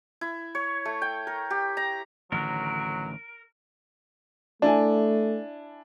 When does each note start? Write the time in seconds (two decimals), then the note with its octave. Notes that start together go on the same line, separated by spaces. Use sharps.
0.21 E4
0.55 C#5
0.85 A3
1.02 G5
1.27 A#4
1.50 G4
1.77 A#5
2.32 A1 D3 D#3 F#3 A#4
4.62 A3 D4 E4 G#5